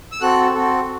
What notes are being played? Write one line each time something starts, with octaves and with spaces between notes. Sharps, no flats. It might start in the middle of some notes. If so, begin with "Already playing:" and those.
E6
C4 F#4 A4 F#6
C4 F#4 A4